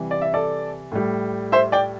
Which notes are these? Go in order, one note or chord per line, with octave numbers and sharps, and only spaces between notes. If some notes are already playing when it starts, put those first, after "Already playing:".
Already playing: C3 E3 G3
D5
E5
A4 D5
A2 G3
C5 E5
D5 G5